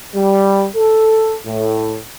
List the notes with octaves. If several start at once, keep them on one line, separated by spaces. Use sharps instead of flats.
G3
A4
A2